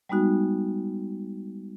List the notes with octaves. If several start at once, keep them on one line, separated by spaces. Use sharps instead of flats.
G3 G#3 B3 D#4 F#4